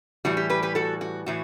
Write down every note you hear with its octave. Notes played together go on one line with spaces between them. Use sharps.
A2 E3 G3 F#4
G4
G4 B4
G4 B4
F#4 A4
F#4
A2 E3 F#4